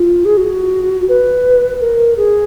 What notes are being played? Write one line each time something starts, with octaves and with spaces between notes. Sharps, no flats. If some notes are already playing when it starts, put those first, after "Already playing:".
Already playing: F4
G#4
F#4
B4
A#4
G#4